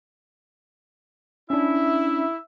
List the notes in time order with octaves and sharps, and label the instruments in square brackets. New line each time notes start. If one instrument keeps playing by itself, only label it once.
[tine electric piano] C#4 D4 [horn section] E4 [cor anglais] E5